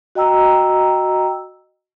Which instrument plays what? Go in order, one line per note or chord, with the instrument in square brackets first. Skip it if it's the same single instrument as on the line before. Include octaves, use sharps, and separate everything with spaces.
[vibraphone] F#4 D#5 G5 A#5 E6